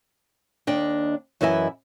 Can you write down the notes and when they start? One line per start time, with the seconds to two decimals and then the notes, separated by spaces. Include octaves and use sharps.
0.67 D#2 D4 D#5 G5
1.41 F#2 E3 E4 D#5 E5 G#5